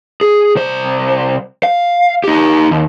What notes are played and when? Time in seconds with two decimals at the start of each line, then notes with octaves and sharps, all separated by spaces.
0.21 G#4
0.55 C2 C5
1.63 F5
2.24 D#4 G4
2.71 D#2